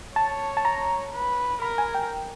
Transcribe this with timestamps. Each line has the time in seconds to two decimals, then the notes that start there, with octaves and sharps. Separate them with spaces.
0.16 C#5 A5
0.57 A5
0.65 A#5
1.13 B4
1.61 A#4 B5
1.78 G#5
1.94 G5